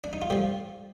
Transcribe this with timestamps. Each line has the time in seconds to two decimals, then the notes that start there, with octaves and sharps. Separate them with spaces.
0.04 D4
0.13 D#4
0.22 F4
0.30 A2 F3 G3 G4